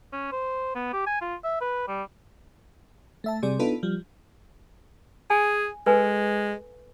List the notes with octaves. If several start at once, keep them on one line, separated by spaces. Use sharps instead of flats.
C#4
C5
B3
G4
G#5
F4
E5
B4
G3
A3 E5 A5
C3 G3 G#4 D5
B3 D4 D#4 F4 A4 B4
F3 G3
G#4 G#5
G#3 A4 B4 G#5